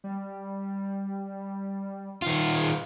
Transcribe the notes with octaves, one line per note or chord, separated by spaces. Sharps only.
G3
D#3 F4
G#4